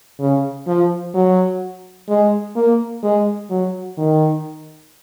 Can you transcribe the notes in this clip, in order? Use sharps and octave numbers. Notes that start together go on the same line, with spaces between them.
C#3
F3
F#3
G#3
A#3
G#3
F#3
D#3